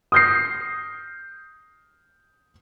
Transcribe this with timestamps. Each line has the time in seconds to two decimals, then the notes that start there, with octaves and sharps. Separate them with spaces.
0.12 D#6 F6 G6 A#6 C7